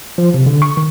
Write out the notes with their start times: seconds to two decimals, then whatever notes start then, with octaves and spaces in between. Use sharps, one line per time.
0.18 F3
0.34 C3
0.46 D3
0.62 C#6
0.77 D#3